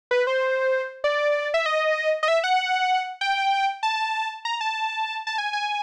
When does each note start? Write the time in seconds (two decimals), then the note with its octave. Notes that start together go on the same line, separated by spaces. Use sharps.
0.11 B4
0.27 C5
1.04 D5
1.54 E5
1.66 D#5
2.23 D#5
2.28 E5
2.44 F#5
3.21 G5
3.83 A5
4.45 A#5
4.61 A5
5.27 A5
5.38 G#5
5.53 G#5